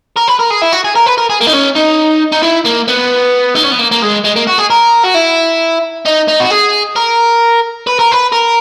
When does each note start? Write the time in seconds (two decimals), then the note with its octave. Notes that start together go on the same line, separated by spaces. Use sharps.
0.16 A#4
0.28 B4
0.39 A#4
0.50 G#4
0.62 E4
0.72 F#4
0.85 G#4
0.96 A#4
1.06 B4
1.18 A#4
1.30 G#4
1.41 A#3
1.47 D#4
1.53 C#4
1.75 D#4
2.33 D#4
2.43 E4
2.66 A#3
2.88 B3
3.55 D#4
3.63 C#4
3.71 B3
3.79 A#3
3.91 A#3
4.02 G#3
4.24 G#3
4.36 A#3
4.47 F#4
4.58 G#4
4.70 A#4
5.04 F#4
5.15 E4
6.06 D#4
6.28 D#4
6.40 F#4
6.51 G#4
6.96 A#4
7.87 B4
7.99 A#4
8.12 B4
8.32 A#4